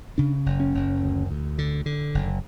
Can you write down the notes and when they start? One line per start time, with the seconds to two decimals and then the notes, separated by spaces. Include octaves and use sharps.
0.18 C#3 D4
0.46 F#1
0.60 C#4
0.75 F#1
1.02 D2
1.31 D2
1.58 D3
1.86 D3
2.15 F#1